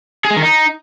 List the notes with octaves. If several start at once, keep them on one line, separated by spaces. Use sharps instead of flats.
G#4
G#3
D#3
D#4